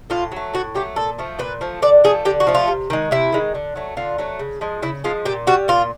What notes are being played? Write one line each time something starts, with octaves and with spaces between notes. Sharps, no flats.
A2 F4
F#3 A3
A2 F#4
F#3 A3 G4
A#2 A4
F3 A3
A#2 B4
F3 A3
D3 D5
F3 A3 G#4
D3 G4
F#4
F3 A3
F4
C3
D#3 G#3
C3 E4
D#3 G#3
D3
F#3 A3
D3 F4
F#3 A3
C#3
F3 G#3
C#3 E4
F3 G#3 F4
A#2 G4
G3 F#4
A#2 F4